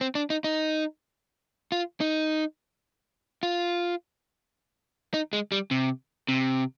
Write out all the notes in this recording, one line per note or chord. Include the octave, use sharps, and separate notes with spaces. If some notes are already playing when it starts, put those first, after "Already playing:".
C4
D4
D#4
D#4
F4
D#4
F4
D#4
G#3
G3
C3
C3